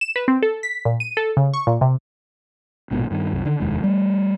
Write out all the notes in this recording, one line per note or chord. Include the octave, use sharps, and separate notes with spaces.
E7
B4
C4
A4
B6
A#2
D#7
A4
C#3
C#6
A#2
C3
A#1 G#2 B2
G2 D#3
C2 F#2
D3 D#3
F1 D#2 G#3
G3 A3